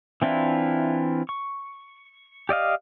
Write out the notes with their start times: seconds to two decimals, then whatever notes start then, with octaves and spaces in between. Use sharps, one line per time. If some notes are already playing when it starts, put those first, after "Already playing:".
0.22 E3 C4 D4 E4 F4
1.29 C#6
2.49 G4 D5 D#5 F5